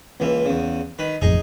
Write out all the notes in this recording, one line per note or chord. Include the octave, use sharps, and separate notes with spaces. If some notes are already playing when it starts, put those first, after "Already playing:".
C#2 E3 A#3
E2 C#3
D#3 B4
E1 A1 F2 D#4 G#4 D#5